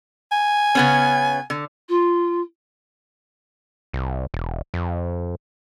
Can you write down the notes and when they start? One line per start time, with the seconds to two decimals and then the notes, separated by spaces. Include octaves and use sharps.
0.32 G#5
0.75 C#3 B3 C#4
1.50 D3
1.88 F4
3.93 C2
4.34 E1
4.74 F2